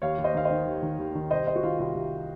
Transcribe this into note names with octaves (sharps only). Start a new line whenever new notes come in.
D#2 C#5 F5
D#2
C5 D#5
D#3 F5
C5 D#5
D#3
D#2
D#3
D#2
D#3
C2 C5 D#5
C2 C5 D#5
F#4
D#3 F4
C2 F4
C2